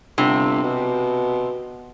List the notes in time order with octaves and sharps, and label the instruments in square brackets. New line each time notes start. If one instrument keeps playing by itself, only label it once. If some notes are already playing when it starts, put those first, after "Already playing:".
[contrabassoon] G1 [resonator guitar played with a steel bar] C3
[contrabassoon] B2